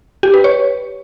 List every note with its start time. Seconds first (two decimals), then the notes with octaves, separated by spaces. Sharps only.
0.23 G4
0.34 B4
0.44 C#5